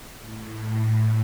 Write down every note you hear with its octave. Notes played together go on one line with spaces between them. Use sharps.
A2